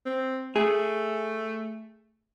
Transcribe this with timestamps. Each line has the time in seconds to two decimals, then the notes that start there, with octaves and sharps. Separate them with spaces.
0.06 C4
0.56 A3 G#4